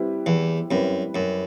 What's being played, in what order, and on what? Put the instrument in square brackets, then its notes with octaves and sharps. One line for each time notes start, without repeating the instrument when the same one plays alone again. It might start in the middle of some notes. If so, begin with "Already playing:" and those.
Already playing: [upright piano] G3 C4 E4 G4 B4
[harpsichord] E2
[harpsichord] F#2 [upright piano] G3 C4 E4 G4 B4
[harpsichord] F#2